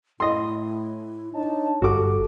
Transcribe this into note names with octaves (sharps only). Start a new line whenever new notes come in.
A2 E4 D#5 C6
D4 D#4 C#5 A5
G1 F#4 G4 A4 D6